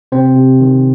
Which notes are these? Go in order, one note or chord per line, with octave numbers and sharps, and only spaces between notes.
C3 C4 C5
C3
D#3